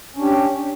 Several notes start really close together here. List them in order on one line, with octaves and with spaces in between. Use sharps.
C#4 D4 G4